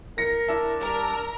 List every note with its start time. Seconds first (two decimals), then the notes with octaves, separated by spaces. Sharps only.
0.18 A#4 A#6 C#7
0.48 D4 E4 A5
0.82 G3 A#4